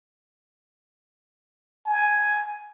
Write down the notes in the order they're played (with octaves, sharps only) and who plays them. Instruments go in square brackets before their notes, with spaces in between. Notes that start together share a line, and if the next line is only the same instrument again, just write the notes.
[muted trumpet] G#5